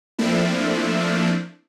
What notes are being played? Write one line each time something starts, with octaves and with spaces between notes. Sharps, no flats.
F3 A3 A#3 C4 D4 E4